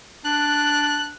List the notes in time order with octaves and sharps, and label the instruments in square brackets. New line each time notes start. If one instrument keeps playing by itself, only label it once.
[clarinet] D4 [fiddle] F#6